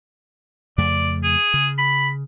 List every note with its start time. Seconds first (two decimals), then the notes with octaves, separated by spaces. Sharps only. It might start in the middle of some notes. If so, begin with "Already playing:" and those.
0.78 F2 C#3 A3 D5
1.24 G#4
1.54 C#3
1.78 B5